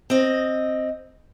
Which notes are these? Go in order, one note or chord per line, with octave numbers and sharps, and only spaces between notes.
C4 D#5